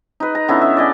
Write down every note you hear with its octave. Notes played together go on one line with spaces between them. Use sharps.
D#4 B4
A#5
D3 B3 C#4 E4
E5
D5 D#5 G#5